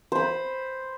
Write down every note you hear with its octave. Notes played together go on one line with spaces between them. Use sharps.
C5 B5